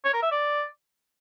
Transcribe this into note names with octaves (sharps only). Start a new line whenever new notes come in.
C#5
A#4
E5
D5